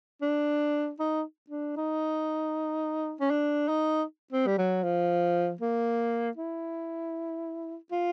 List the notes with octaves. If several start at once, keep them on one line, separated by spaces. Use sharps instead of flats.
D4
D#4
D4
D#4
C#4
D4
D#4
C4
G3
F#3
F3
A#3
E4
F4